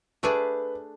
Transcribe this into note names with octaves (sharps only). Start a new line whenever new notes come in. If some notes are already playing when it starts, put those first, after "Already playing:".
A3 D4 G#4 B4 D5